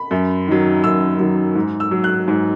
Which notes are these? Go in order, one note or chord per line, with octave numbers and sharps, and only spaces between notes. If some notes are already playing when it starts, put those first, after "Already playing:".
Already playing: B5
F#2
D#3 F#3
F#2 E6
D#3 F#3
G#2
E6
F#3
F#6
G#2